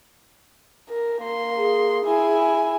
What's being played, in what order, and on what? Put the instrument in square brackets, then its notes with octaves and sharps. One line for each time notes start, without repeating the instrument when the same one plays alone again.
[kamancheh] A#4
A#3 C6
[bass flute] G#4
[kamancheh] E4 G#5